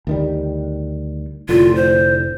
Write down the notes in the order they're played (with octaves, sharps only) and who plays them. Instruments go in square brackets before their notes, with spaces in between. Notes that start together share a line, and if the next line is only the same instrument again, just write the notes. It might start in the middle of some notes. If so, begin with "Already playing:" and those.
[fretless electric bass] D2 D#3 G3
[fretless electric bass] F1 A2 D3 [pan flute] F4
[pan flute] C5